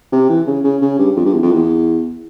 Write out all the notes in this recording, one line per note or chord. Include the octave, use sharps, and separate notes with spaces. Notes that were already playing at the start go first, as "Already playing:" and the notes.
C3
E3
C#3
C#3
C#3
G2
F2
G2
E2
F2
E2